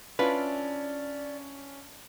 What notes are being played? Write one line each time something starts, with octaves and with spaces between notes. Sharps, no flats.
C#4 D4 E4 F4 B4 D5